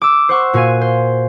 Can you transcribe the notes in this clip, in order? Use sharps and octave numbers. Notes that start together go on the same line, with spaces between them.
D6 E6
C5 F#5 C#6 E6
A#2 F#4 F5 G#5 D#7
C5